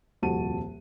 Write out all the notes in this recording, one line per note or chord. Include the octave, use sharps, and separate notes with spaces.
D#1 C2 F2 F#4 A5 D#7